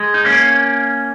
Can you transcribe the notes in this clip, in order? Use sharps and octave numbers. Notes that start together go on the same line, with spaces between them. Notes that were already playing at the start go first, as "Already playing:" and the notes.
Already playing: G#3
D#4
A#3 C#4